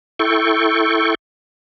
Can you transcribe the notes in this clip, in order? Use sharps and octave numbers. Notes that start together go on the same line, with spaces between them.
E4 A4 G5 C#6